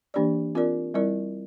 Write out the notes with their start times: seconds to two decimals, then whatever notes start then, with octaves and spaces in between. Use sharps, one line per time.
0.14 E3 A#3 D4 G4 D5
0.55 C4 F4 A#4 D5
0.94 G3 C4 E4 A#4 D5